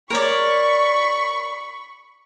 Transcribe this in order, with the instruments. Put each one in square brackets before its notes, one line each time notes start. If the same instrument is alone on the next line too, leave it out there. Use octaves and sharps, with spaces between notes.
[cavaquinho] A#4 C#5 D5 [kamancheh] B5 C#6